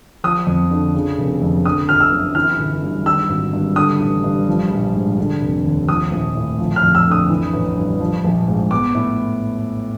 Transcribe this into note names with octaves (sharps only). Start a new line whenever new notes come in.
F3 D#6
F2
D3
C#3
F1
F2
D3 D#6
G1 F6
E6
F#2
E3 F6
G1
G2
D#3 E6
G#1
G2
D3 D#6
A1
G2
F3
A#1
G#2
D3
F1
D#2
F3 D#6
A#1
A2
F3
F6
F2
E6
D3
D#6
E3
A1
G2
F3
A#1
G#2
B3 D6
A2